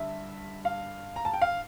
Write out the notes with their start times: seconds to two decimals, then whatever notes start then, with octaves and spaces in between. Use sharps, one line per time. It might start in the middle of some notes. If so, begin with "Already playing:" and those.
Already playing: G2 D3 E5
0.65 F5
1.16 A#5
1.25 A5
1.33 G5
1.42 F5